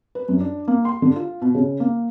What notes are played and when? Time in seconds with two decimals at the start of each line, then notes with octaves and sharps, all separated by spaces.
0.15 B4
0.29 F#2
0.40 D4
0.68 A#3
0.85 C6
1.02 D3
1.16 F4
1.42 B2
1.55 C#3
1.80 A#3